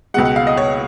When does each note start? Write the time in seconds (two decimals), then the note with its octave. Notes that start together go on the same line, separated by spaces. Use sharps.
0.14 C#2 B2 G#3 F#5
0.25 F#5
0.36 F5
0.47 D#5
0.57 C#5